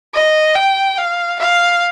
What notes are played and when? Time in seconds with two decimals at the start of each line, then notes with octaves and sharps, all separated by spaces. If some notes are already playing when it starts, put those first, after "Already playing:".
0.14 D#5
0.55 G5
0.98 F5
1.39 F5